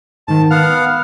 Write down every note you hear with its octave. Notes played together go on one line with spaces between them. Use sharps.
G#2 D#3 A5
B3 F5 F#5 F6